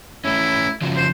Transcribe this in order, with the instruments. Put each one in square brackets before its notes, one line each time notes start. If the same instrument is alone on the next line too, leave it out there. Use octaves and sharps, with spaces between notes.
[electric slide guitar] A3 C#4 [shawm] E4
[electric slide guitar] C#3 F3 F#3
[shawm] C5